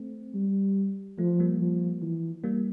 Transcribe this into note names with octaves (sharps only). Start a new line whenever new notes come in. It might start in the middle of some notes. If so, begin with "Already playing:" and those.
Already playing: A3 C4
G3
F3 A3
G3 A#3
F3
E3
G3 A#3